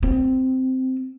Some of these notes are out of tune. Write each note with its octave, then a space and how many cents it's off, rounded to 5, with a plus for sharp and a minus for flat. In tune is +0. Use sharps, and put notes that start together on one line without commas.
C4 -10